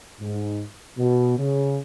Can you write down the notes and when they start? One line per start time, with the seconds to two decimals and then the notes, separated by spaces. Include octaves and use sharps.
0.21 G#2
0.98 B2
1.38 C#3